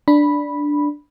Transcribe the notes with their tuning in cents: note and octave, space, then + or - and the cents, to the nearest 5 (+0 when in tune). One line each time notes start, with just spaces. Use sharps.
D4 +0 B5 -5